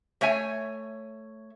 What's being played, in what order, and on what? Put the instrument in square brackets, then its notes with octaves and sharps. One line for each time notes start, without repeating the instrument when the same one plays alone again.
[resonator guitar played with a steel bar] A3 C#5 E5 G#5